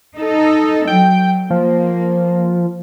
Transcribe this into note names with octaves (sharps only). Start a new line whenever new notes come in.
D#4 A4
F#3 G5
F3 A#3